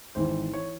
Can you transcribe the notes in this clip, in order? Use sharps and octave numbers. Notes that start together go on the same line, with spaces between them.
G#1 G#2 E3 C5
E3 C#5